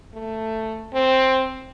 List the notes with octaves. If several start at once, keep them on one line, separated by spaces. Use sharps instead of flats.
A3
C4